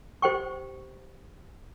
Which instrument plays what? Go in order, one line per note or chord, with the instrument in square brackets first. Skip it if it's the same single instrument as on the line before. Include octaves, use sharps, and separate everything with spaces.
[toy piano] G4 C5 G5 C#6